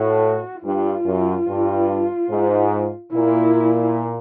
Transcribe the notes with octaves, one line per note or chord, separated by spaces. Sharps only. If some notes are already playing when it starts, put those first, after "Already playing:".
Already playing: A2 F#4
G2 F4
F#2
G2
G#2
A#2 E4